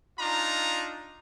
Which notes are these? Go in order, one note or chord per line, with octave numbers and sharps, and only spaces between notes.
D4 D#4 F4 A#5